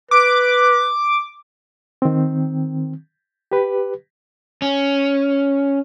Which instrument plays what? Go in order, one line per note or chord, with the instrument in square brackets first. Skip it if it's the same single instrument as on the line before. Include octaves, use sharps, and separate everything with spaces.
[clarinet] B4 [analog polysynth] D6
[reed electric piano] D#3 C4
G4 B4
[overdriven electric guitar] C#4